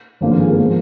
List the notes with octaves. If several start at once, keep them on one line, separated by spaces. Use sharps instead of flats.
G#1 G2 D3 F3 A#3
F4
G#4
A#4
F3 G#3